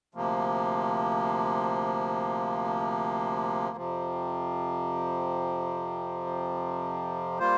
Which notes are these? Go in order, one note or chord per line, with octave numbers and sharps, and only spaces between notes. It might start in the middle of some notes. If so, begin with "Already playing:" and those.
D2 C3 F3 A#3
F2 C3 F3
G3 A#3 F4 C5